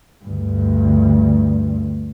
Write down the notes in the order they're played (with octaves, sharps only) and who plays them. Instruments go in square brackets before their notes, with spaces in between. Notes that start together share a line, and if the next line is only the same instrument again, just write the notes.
[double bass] D2 G2